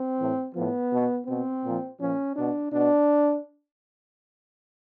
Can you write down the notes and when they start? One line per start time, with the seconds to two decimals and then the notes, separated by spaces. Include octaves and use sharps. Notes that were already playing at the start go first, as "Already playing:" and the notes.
Already playing: C4
0.19 A2 E3
0.55 A2 F3 B3
0.91 B2
1.27 B2 C4
1.63 A#2 F3
2.00 A#2 F3 C#4
2.36 B2 D4
2.72 B2 D4